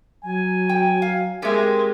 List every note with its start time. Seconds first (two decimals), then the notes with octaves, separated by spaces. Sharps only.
0.24 F#3 G#5
0.69 G5
1.02 F5
1.42 G#3 C4 G4 A#4 E5